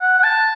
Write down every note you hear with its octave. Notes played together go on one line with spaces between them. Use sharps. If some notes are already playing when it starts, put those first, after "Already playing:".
F#5
F#5
A5